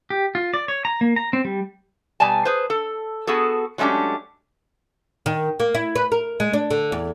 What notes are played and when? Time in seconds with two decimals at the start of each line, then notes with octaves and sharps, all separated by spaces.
0.10 G4
0.35 F4
0.54 D5
0.68 C#5
0.85 A#5
1.01 A#3
1.16 A#5
1.33 C4
1.45 G3
2.20 B2 G3 D5 G#5 A5
2.45 G#4 B4 C5
2.70 A4
3.27 B3 F#4 G#4 A4
3.78 F#3 G#3 A3 C#4 D4 G4
5.26 D#3
5.60 A#3
5.74 E4
5.95 B4
6.12 A#4
6.40 G#3
6.53 D4
6.71 D3
6.92 E2